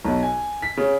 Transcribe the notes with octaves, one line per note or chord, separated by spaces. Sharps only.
B1
G#5
B6
C#3